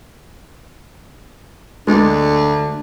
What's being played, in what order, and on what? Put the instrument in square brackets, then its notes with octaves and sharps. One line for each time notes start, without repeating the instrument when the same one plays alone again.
[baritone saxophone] D2 [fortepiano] G#3 [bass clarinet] D4